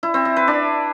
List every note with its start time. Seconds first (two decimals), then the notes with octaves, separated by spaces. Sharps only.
0.03 E4
0.14 C4
0.25 E5
0.36 B4
0.48 D4